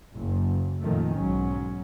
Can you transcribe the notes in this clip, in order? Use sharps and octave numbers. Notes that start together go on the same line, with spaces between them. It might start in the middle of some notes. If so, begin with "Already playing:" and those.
F#1
F2 A#2 D#3 F3 A3
B1 G#2 F#3 C#4